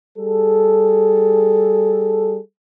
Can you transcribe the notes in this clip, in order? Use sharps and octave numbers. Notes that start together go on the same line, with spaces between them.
G3 G#4 A4